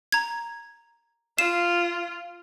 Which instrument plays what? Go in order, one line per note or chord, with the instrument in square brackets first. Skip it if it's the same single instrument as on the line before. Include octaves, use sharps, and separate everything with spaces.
[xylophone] A#5 G#6
[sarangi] F4 [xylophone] C7 E7